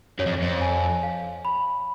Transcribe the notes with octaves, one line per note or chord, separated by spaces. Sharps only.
F#2 C#5
F2
F2
G#5
F5
B5